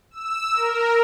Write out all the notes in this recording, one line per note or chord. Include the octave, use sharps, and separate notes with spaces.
E6
A#4